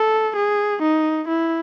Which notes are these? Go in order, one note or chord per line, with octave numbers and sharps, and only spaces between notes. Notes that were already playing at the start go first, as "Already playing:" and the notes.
Already playing: A4
G#4
D#4
E4